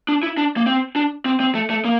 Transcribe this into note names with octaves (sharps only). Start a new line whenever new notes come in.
D4
E4
D4
A#3
C4
D4
C4
C4
A3
A3
A#3